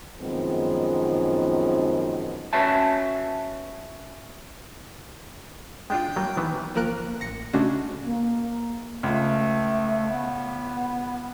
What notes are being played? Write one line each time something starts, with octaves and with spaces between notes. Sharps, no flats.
F#2 D#3 F3 G#3 B3 C4
C#4 F#4 B4 C#5 E5 A5
G#3 D4 F4 G5
F#3 G3 A#3
D#3 E3 B3
G1 F3 A#3 A#4 F#6 D7
A1 A#6 C#7
C#3 G#3 A3 C#4 D4 F#4
A#3
C#2 A3
B3